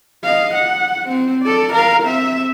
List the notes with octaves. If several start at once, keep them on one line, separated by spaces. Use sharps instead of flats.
D#5 F5
F#5
C4
A4 D5
A#4 F5
C4 E5